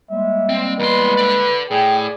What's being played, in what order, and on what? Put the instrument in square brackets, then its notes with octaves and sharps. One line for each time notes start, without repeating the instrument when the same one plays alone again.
[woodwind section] G3 G#3 A#3 [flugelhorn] E5
[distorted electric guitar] C4
[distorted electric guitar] E2 C6 [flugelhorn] B4
[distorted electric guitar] A4 D5
[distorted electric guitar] A2 [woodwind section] G#4 D5 G#5 [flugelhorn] G5